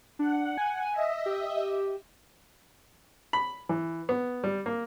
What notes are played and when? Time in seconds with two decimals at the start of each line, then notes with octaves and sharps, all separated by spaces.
0.19 D4 F#5
0.57 G#5
0.92 D#5 E5
1.26 G4
3.33 B5
3.69 E3
4.09 B3
4.44 G3
4.66 A#3